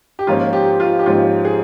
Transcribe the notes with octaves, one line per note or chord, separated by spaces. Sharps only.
G4
G#2 F3 A#3 C#4 F4
G4
F4
G4
G#2 F3 A#3 C#4 F4
G#4